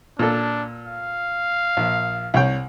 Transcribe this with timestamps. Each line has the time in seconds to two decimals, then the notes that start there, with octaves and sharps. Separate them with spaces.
0.19 A#2 D4 A4
0.86 F5
1.77 A#1
2.34 C2 C#5 G5